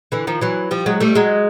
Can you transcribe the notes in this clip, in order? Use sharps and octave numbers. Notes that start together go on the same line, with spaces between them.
D3 E3
D#3 F3
E3 F#3
F3 G3
F#3 G#3
G3 A3
F#3 G#3